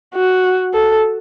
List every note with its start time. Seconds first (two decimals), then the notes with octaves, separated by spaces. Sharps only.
0.15 F#4
0.74 A4